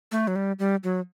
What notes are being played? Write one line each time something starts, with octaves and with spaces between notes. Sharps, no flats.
A3
F#3
G3
G3
F#3